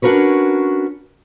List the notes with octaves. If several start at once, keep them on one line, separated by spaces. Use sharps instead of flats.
C#4 D4 F#4 A#4 B4 C#5